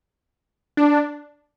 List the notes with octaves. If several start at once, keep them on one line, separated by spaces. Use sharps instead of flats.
D4